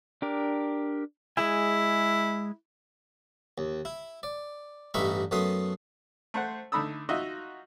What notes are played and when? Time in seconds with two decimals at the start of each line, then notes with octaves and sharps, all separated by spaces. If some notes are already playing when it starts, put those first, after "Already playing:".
0.22 D4 G4 A#4
1.37 G#3 E4 G#4 G#5
3.58 D#2
3.85 E4
4.23 D5
4.94 A1 G2 D#4 E5 B5 C#6
5.31 F#2 A3 B3 C6 D#6
6.34 A3 C5 F#5
6.72 D3 A3 D#4 B5 D#6 E6
7.09 D#4 F4 F#4 D#5 E5